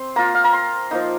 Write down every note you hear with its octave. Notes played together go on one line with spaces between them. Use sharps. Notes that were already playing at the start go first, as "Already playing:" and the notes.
Already playing: C4 C6
A#3 F4 A#5
F5
A#5
C6
F3 A#3 D#4